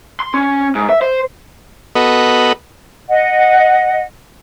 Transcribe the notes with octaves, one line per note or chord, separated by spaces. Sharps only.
C6
C#4
G#2
E5
C5
B3 F#4 A4 B4 D#5
D#5 F#5